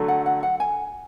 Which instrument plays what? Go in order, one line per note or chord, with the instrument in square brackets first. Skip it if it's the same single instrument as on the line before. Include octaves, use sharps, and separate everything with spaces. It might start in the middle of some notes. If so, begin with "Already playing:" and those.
Already playing: [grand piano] D3 F#3 A3
[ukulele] F#5
F#5
F#5
G#5